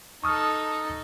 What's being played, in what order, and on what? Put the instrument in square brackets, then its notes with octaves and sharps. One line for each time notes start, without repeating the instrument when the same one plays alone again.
[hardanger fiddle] D#4 A4 [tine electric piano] C#6 D#6 F6